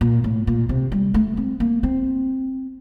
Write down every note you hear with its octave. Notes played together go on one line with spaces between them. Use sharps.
A#2
A2
A#2
C3
G3
A3
C4
A#3
C4